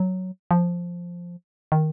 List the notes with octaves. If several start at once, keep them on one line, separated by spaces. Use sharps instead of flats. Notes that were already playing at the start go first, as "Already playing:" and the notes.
Already playing: F#3
F3
D#3